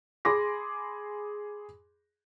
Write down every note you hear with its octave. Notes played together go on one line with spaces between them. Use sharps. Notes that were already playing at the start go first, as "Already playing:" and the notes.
G#4 B5 C6 D6 A#6